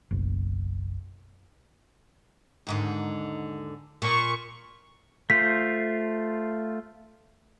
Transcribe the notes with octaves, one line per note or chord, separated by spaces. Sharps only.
F#1 B1
D#2 G#2 D3
A#2 C#6
A3 F4 C5 B6